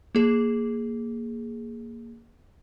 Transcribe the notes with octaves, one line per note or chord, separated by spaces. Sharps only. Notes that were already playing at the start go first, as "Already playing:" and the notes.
A#3 G#4